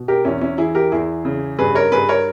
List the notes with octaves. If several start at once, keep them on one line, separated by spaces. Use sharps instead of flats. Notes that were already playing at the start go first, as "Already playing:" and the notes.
Already playing: B2
G4 A#4
E2 C#4 E4
C#4 E4
E3 E4 G#4
G4 A#4
E2 E4 G#4
C#3
G2 G#4 B4
A#4 C#5
G2 G#4 B4
A#4 C#5